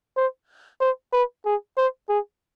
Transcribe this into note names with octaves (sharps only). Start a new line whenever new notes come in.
C5
C5
B4
G#4
C5
G#4